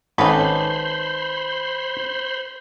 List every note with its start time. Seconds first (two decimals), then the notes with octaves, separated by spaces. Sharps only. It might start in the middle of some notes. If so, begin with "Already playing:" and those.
0.18 G#1 C#4 D#4 A4 B4 C5 B5 C6